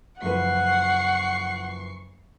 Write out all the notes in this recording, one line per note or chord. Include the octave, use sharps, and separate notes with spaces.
F#1 F3 B4 F#5 C#6 C7